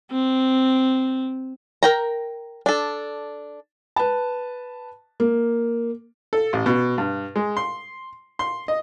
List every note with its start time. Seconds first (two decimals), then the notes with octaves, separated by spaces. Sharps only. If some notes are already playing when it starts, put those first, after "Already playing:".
0.12 C4
1.83 A#4 G5 A#5
2.66 D4 A4
3.96 B4 A5
5.20 A#3
6.33 A4
6.53 A1
6.66 B2
6.98 G2
7.36 G#3
7.57 C6
8.39 C6
8.68 D#5